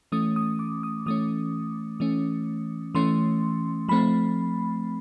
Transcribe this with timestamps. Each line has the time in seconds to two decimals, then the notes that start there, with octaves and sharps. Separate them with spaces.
0.12 E3 A3 C#4 D#6
0.36 D#6
0.59 D6
0.83 D#6
1.06 E3 A3 C#4 D#6
2.00 E3 A3 C#4
2.95 E3 A3 C#4 C6
3.89 F3 A3 C4 B5